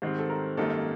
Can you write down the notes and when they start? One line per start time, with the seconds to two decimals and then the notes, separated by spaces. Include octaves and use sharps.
0.02 G#2 D#3 G3 C4 C5
0.19 A4
0.30 A#4
0.57 G#1 F#2 D#3 G3 A#3 A4